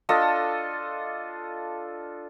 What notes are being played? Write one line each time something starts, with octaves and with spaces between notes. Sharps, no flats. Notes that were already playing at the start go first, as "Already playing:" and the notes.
D4 F4 A4 D#5